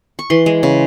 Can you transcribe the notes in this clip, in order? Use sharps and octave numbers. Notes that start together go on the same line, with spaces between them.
C#6
E3 C6
G#3
C#3